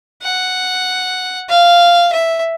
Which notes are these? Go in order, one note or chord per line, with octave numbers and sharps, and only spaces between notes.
F#5
F5
E5